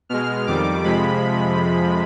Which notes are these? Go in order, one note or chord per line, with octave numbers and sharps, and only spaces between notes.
B2 G#3 F6
F2 D#3 G3 D6
F2 C3 F3 G#3 B5